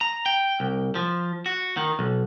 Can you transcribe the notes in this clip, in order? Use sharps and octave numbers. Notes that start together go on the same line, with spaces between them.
A#5
G5
C2
F3
F#4
D#3
B1